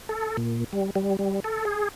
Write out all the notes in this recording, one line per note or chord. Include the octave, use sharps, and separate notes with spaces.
A4
A#2
G3
G3
G3
A4
G#4